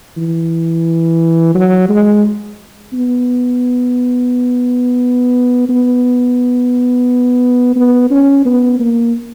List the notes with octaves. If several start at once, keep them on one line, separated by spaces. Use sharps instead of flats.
E3
F#3
G#3
B3
B3
B3
C#4
B3
A#3